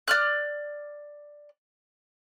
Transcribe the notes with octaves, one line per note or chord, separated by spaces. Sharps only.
D5 F6 F#6